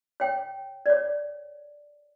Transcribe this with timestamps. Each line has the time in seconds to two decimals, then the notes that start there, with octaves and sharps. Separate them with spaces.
0.20 C#5 G5
0.86 C#5 D5